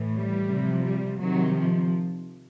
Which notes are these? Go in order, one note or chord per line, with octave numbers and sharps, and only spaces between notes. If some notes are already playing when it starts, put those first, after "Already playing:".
Already playing: A2 E3
G3
C3 F3
G3
C3 D#3 F#3
F3